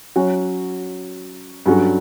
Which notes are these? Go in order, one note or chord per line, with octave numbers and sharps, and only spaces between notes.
F#3 C#4 F#4
G2 F#3 C#4 F#4 A4